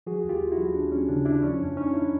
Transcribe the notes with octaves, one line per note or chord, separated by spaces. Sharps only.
F3 F#4 G#4
D#2
F4 G4
D#2
E4 F#4
F3
D#2 D4
F3 C#4
C#3 D4
C#3 D4 E4
F3 C#4
F2 D4
F2 C#4 D#4
F2 D4 E4